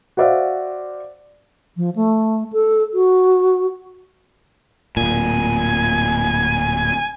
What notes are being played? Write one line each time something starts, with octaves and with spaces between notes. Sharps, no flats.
F#4 C5 D5 E5 F5
F3
A3
A4
F#4
D1 A#2 G#5